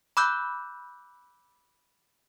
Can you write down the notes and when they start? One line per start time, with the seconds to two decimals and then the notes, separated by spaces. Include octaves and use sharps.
0.17 B5 D6 E6 F#6 G6